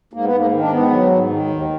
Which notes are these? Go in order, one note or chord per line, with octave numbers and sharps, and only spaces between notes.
G#2 A#3
B3
G#2 A#3
D#3
D4
G#2 B3
F#3
G#2
D#3
D#2